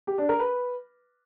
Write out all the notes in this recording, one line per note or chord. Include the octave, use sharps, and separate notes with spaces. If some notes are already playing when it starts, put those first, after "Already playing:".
G4
D4
A#4
B4